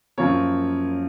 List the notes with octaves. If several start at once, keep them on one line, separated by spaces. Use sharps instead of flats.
F#2 F3 A#3 C#5